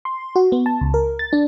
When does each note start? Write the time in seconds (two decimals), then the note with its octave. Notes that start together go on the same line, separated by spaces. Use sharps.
0.05 C6
0.36 F#4
0.52 B3
0.66 A5
0.81 C#2
0.94 A#4
1.19 A6
1.33 D4